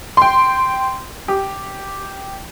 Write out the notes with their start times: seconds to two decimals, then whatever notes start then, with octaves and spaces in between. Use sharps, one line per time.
0.17 G5 C6
1.28 G4